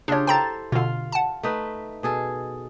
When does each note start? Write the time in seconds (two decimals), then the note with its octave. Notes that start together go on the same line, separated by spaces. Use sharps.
0.08 C#3 D4 F4 G4 C#5
0.27 E4 A4 C5 G5 A#5 A6
0.72 B2 D3 F4 F5
1.12 F#5 A5
1.43 A3 D#4 B4
2.03 B2 G#4 A4